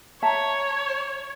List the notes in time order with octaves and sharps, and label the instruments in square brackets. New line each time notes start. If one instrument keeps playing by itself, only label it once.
[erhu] C#5 [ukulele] E5 A5 A#5